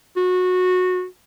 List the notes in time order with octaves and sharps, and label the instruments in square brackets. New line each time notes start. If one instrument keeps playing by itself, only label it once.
[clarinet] F#4